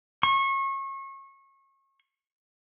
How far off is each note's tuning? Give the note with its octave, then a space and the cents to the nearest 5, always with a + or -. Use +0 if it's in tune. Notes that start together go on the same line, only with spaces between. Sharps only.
C#6 -30